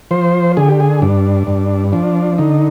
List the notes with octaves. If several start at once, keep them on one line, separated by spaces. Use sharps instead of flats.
F3 C5
D3 G#4
G4
G#4
G2 D4
G2
F3 D4
D3 D#4